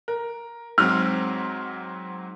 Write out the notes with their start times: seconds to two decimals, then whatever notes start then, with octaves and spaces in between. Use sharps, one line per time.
0.08 A#4
0.78 G#2 F#3 C4 F6